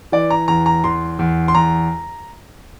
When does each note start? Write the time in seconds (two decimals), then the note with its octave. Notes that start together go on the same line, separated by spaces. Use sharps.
0.12 E3 D5
0.30 A#5
0.48 E2 A#5
0.66 A#5
0.84 E2 C6
1.19 E2
1.48 C6
1.55 E2 A#5